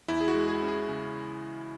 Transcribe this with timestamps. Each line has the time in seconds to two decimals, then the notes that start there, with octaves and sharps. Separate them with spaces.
0.08 E2 E4
0.21 G#4
0.28 F#4
0.34 G#3
0.48 G#4
0.62 C#4
0.68 G#4
0.89 C#3